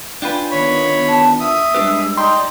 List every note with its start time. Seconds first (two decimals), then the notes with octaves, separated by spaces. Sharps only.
0.22 D4 F4 B4 G5 G#5
0.51 D#3 B3 C#5 B5
1.07 A5
1.40 E5 D#6 E6
1.75 G3 G#3 D4 G4 B4
2.17 D#4 D5 G5 A#5 C6